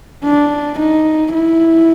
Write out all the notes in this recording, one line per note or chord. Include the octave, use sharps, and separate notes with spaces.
D4
D#4
E4